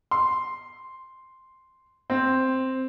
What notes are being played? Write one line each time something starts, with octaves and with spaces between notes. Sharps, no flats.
C6
C4